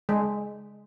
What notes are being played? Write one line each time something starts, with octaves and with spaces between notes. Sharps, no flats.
G#3